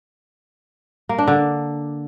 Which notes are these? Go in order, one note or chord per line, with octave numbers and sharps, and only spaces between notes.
A#3
D4
D3